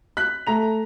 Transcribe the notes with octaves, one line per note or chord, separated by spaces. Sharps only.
F#6 B6
A3 A#5 F7